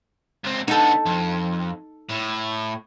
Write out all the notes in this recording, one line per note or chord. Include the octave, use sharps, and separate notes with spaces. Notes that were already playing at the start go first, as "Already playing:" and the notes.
C#2 C4
D3 B3 D#4 A4
F2
A2